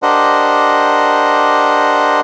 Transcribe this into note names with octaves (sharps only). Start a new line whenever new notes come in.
D4 G4 A#4 C5 D#5 F#5